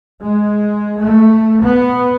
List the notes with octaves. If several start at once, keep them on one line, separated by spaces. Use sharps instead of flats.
G#3
A3
B3